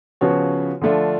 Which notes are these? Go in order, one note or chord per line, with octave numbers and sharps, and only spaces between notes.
C#3 F3 B3 F#4 C#5
D3 F3 A3 D4 F4